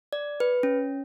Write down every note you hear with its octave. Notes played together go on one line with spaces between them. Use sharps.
D5
B4
C#4